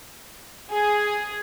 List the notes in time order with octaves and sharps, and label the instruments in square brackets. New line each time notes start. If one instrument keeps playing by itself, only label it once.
[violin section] G#4